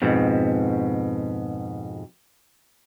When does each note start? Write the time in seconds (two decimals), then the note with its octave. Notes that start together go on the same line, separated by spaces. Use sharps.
0.02 F2 G#2 B2